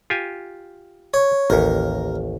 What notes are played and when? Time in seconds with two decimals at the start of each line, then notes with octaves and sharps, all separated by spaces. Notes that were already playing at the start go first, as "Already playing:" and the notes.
0.10 F4 G4 G#5
1.14 C#5
1.50 A1 D#2 A#4